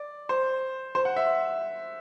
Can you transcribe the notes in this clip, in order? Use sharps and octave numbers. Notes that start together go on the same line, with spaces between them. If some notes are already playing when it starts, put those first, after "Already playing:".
Already playing: D5
C5
C5
F#5
E5